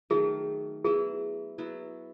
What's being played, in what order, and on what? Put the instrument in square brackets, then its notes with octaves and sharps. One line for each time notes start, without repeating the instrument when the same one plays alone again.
[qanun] D#3 F#3 A3 D#4 [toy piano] G#4
[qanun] F#3 B3 E4 [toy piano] G#4
[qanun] F#3 B3 E4